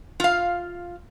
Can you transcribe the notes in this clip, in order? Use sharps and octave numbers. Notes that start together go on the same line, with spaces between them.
F4 F5